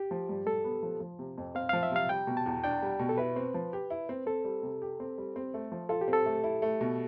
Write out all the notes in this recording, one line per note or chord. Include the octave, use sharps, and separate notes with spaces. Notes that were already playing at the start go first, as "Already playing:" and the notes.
Already playing: G4
F3
G2
G2 A4
B3
F3
F3
C3
F2
C4 F5
F3 F5
E5
C3 F5
G3 G5
B2
A5
E2
D4 G5
G3
B2
A4
E4 B4
C4
F3
G4
E4
C4
C4 A4
G3
C3
G4
C4
G3
C4
A3
F3
F4 A4
G4
C4
A4
A3
E4
A3
B2